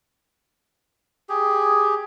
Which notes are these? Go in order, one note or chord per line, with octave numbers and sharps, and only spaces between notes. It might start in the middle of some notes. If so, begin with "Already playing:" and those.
G4 G#4